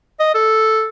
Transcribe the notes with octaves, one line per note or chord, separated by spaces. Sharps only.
D#5
A4